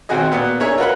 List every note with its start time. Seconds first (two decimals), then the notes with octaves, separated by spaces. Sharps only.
0.09 G#1 D#2 C4 F#4 G#4 D#5
0.32 A#2 B3 F#4
0.60 D4 D#4 G#4 A#4 C#5 E5
0.78 F4 F#4 A#4 B4 F#5 B5